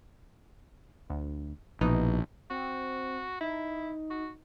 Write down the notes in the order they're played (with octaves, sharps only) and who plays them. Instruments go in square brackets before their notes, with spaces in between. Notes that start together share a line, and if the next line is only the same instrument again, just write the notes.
[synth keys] D2
[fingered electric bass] A#1 [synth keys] B2 E3 D#4
[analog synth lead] C4 [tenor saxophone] F#4
[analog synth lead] D#4 [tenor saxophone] E4
[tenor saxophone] F#4